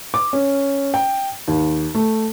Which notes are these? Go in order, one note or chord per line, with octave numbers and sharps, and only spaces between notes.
D6
C#4
G5
D#2
A3